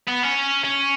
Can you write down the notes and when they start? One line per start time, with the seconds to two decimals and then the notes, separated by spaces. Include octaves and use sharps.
0.07 B3
0.23 C#4
0.64 C#4